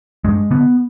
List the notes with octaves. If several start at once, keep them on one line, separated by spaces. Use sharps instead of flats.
G2 G#3
D3 B3